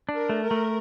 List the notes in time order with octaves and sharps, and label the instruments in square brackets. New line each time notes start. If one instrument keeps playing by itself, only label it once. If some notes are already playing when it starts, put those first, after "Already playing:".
[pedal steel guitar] D4
[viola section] A#4
[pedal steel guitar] A3
[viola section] A#4
[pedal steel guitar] A3